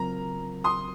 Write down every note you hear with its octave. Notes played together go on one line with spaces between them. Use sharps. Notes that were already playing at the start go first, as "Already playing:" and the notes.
Already playing: C#3 F#3 C4 F4 A#4 A#5
C6 D#6